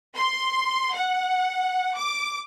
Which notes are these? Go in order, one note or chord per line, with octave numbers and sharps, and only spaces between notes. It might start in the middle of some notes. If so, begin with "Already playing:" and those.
C6
F#5
D6